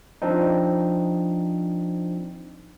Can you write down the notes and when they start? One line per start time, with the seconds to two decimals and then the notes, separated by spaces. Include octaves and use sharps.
0.22 F3 C4 D4 D#4